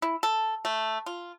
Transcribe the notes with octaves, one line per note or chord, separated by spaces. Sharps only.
E4
A4
A3
F4